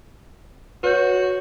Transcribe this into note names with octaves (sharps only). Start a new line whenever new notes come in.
F#4 B4 C#5 G6